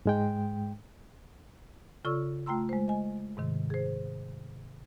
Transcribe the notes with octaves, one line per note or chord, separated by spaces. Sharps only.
G#2 G#3 G5
C#3 F4 A4 D5 C#6 E6
A3 F4 G5 A#5 C6 E6
G#3 C5
D#5 G#5
G#2 C3 D#3
G#4 C5